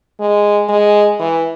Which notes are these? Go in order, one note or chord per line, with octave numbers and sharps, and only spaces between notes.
G#3
G#3
E3